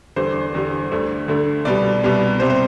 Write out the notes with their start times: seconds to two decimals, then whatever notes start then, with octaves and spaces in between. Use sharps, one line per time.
0.16 E2 D3 G3 C5
0.55 E2 D3 G3
0.92 D2 D3 A3
1.28 D2 D3 A3
1.65 C2 B2 G3 D5
2.04 C2 B2 G3
2.40 C3 G3 C5
2.50 C5